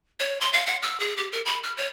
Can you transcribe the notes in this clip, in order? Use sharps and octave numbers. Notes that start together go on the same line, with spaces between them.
C#5
C6
F5
F#5
E6
G#4
G4
A#4
B5
F6
C#5